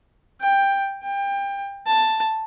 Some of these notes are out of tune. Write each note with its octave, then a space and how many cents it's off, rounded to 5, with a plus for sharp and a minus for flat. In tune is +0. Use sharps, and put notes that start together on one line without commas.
G5 +10
G5 +25
A5 +5